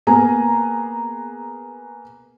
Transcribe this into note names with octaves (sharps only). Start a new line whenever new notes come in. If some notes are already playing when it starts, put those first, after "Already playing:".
A#3 B3 G#4 G#5 A#5